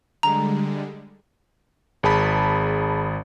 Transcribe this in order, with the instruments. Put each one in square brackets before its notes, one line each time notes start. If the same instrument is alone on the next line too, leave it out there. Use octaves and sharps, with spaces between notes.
[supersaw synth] D3 G3 G#3 [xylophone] A#5
[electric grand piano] G#1 G#4 A5 B5